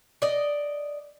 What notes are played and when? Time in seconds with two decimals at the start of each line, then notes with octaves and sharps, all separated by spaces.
0.22 D5 D#5